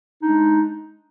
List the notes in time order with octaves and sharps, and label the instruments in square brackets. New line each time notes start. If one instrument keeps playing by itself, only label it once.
[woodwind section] D#4
D4
G#3